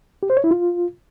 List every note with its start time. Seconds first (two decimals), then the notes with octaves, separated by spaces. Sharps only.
0.23 G4
0.30 C5
0.37 C#5
0.44 E4
0.51 F4